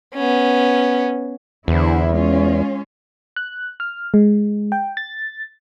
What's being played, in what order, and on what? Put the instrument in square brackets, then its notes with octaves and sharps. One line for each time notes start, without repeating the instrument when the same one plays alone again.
[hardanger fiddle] B3 C#4
[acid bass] E2 [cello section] D3 E4 C5
[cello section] G#3 C#4 F4
[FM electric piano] F#6
F6
G#3
G5
A6